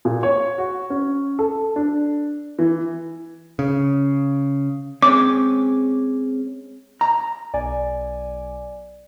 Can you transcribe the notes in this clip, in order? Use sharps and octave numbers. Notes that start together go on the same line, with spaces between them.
A#2
C#5
F#4
C#4
A4
D4
E3
C#3
G#3 C4 C#4 D6
A#5
B1 D5 G#5